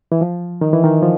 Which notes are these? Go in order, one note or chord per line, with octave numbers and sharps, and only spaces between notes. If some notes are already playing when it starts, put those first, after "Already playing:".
E3
F3
D#3
E3
D#3
F3